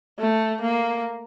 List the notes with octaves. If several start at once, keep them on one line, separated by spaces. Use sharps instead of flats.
A3
A#3